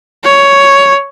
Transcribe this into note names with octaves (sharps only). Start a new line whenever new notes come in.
C#5